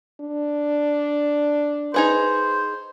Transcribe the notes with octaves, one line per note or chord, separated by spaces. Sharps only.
D4
D#4 G#4 B4 C5